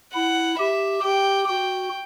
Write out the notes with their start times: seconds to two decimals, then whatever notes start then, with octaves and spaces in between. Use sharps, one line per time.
0.14 E4 F#5
0.59 G4 E5
1.04 G4 G5
1.48 F#4 G5